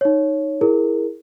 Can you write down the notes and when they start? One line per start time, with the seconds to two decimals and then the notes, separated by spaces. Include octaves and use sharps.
0.01 D#4 C#5
0.61 E4 G#4 A#4